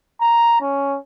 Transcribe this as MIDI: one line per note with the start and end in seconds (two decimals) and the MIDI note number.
0.21 0.59 82
0.61 0.98 61